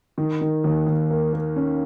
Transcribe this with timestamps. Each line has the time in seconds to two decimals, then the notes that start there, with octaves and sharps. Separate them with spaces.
0.18 D#3
0.41 D#3
0.64 D#2
0.87 D#2
1.10 A#3
1.33 A#3
1.56 C#4